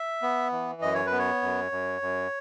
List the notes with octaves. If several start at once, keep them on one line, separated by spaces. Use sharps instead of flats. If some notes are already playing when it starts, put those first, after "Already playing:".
Already playing: E5
B3
E3
F#2 D#5
C#5
B4
B3
C#5
F#2
F#2
F#2